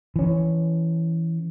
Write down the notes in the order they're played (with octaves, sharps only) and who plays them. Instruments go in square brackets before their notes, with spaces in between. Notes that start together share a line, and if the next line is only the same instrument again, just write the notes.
[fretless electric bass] E3 C#4